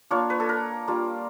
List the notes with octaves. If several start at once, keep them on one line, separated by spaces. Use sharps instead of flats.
A#3 D4 F4 C#5
B4
A4
A#4
G3 A#3 D4 F4